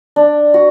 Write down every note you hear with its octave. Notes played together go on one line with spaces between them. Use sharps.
D4
F#4